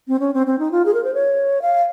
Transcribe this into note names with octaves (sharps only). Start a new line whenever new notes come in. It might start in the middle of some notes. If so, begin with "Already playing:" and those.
C4
C#4
C4
C4
D#4
F4
G#4
A#4
C5
C#5
F5